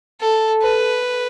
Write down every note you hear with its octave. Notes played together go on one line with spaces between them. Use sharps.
A4
B4